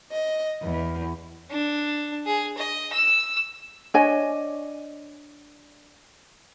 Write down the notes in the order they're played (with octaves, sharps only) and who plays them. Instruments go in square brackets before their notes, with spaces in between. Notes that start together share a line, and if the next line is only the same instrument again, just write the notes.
[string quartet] D#5
E2
[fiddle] D4
G#4
D#5
E6
[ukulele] D4 C#5 D#5 G#5